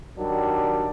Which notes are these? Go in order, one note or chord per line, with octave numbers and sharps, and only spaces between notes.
D#3 F#3 G3 D4